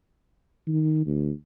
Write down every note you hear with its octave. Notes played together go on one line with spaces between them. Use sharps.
D#3
D2